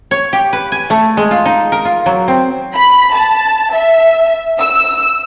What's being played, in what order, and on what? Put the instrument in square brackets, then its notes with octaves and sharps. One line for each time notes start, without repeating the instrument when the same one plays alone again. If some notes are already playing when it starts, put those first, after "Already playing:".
[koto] C#5
G4
B4
G#5
A3
G#3
F4
D#4
A#4
F4
F#3
C4
[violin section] B5
A5
E5
E6